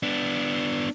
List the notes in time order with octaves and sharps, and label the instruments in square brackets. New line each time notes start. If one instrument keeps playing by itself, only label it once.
[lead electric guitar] B3 D4